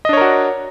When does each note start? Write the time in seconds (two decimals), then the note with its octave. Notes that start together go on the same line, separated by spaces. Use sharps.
0.05 D#5
0.09 D4
0.13 C#5
0.17 A#4
0.21 F#4